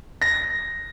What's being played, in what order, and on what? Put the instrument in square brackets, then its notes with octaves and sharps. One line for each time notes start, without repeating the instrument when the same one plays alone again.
[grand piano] A#6